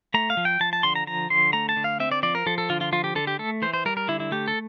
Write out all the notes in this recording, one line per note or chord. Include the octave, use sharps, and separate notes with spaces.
A3 A#5
F5
F3
G5
F3 A5
A5
D3 C6
A#5
F3 A#5
D3 C6
A3 A#5
A5
D3
F5
C4 E5
D5
F3 D5
A#4
F3 A4
A4
D3 F4
F4
F3 F4
G4
D3 A4
G4
A3 A4
E3 C5
C5
G3 A#4
A#4
D3 E4
E4
A3 G4
A4